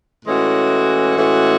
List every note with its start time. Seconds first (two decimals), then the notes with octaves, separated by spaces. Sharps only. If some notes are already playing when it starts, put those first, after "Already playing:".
0.25 A2 E3 G#3 C#4 F#4
1.17 A2 E3 G#3 C#4 F#4